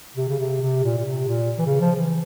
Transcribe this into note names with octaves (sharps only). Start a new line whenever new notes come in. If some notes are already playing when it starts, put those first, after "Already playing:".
C3
C#3
C3
C3
A#2
A#2
C3
A#2
E3
C#3
F3
E3